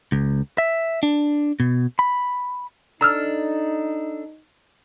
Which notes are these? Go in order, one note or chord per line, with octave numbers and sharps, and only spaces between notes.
C#2
E5
D4
B2
B5
D4 D#4 A4 A#5 E6 F6